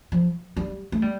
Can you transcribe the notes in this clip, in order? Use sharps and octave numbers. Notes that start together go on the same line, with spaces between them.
F3
G3
A3
G3